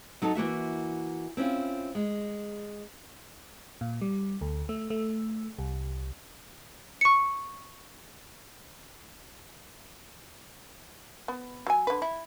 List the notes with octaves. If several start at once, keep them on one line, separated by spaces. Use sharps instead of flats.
F#3 D#4 A4 A5
E3 A#3 F#4 E5
C4 C#4 E4 F4
G#3
A#2
G3
D2
A3
A3
C2
C#6 C#7
B3
F#3 G#5
D3 B4
E4